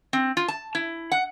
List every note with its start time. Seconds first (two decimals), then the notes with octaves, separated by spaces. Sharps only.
0.13 C4
0.37 F4
0.48 A5
0.75 E4
1.12 F#5